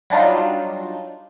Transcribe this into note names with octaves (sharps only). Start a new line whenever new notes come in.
F#3 G3 D4 D#4 F4